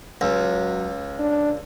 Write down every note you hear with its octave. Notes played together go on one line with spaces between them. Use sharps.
C#2 F#3
D4